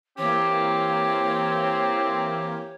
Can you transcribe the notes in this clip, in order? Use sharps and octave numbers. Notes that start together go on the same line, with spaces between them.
E3 A#3 C4 G4 C#5